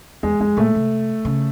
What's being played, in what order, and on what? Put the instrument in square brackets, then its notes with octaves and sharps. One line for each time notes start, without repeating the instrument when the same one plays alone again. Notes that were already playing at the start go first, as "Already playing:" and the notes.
[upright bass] E2 [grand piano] G#3
[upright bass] F2 [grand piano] G#3
[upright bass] A#2 [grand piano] A3
[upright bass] C3
C#3